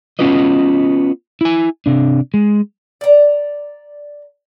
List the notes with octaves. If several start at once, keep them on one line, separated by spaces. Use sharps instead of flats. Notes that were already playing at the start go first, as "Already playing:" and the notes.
B3 C#4 F4 F#4 B4 D#5
E4 G#5
C3 D4
G#3
D5 A#5